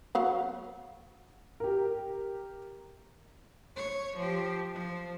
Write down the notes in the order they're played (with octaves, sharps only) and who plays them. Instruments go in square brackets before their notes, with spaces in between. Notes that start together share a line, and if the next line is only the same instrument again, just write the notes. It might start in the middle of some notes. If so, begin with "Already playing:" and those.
[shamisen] F#3 F5 F#5
[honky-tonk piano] G4 A#4
[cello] C#5
F3 G4
F3